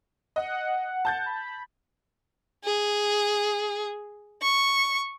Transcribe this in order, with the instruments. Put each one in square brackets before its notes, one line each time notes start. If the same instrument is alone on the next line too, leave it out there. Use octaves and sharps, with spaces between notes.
[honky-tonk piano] D#5 [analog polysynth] F#5
[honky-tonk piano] A5 G6 A6
[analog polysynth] B5
[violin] G#4
C#6